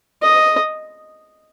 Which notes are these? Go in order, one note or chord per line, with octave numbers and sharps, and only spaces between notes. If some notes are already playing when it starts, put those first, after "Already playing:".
D#5